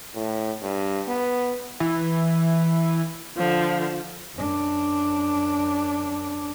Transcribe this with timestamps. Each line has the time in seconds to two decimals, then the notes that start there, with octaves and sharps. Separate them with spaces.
0.15 A2
0.62 G2
1.08 B3
1.80 E3
3.37 D3 F3
4.36 F#2 D4